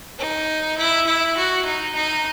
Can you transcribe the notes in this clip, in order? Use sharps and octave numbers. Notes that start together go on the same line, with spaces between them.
D#4
E4
E4
F#4
D#4
D#4